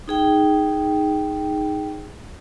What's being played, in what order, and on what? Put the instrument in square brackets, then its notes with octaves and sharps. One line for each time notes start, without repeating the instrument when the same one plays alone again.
[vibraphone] D#4 G#4 G5